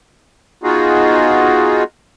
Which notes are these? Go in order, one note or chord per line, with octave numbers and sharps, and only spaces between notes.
B3 D#4 F4 F#4 G#4